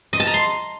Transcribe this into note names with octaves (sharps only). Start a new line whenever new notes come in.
D#5
A5
A#5
C6